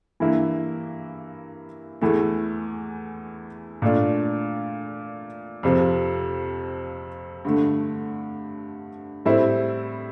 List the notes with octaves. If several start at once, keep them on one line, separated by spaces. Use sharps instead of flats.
G2 E3 A#3 E4
E2 E3 A3
A#2 A3 D4 F4
F2 C3 F3
G2 D3 A3
A2 G3 C4 E4